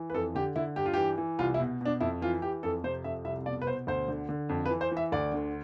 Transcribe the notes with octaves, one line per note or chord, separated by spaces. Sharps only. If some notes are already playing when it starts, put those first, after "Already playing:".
Already playing: E3
B4
F2 A4
D3 G4
D3 E4
G2 G4
F4
E3 G4
E3
C2 F4
E4
B2
B2 D4
F2 E4
E3 F4
E3 G4
F2 A4
C3 C5
F2 E5
C2 E5
B2 D5
B4
B2 C5
D2 C5
D3
D3
F2
B4
E3
C5
E3
E5
D2 D5
D3